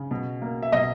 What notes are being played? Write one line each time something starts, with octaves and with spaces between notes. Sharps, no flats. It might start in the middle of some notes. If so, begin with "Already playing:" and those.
Already playing: C#3
B2
A#3
E5
B2 D#5